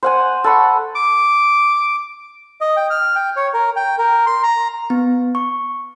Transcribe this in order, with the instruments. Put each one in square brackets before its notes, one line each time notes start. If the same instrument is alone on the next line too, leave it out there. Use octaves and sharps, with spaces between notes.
[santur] C5 F#5 G#5
A4 F#5 B5 C#6
[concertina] D6
D#5
G5
F6
G5
C#5
A#4
G5
A#4
C6
A#5
[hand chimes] B3
C#6